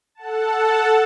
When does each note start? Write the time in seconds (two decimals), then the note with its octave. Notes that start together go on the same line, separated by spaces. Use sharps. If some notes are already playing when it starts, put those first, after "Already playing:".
0.15 A4 F#5 A5